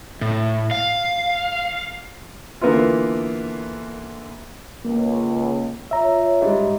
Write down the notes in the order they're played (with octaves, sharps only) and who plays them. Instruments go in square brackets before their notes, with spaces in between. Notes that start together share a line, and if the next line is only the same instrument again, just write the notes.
[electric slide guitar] A2
F5
[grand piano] D3 E3 A#3 B3 E4 F4
[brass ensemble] C#2 [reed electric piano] A#3
[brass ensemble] F4 C#5 [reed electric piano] E5 A#5
[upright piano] G#2 G3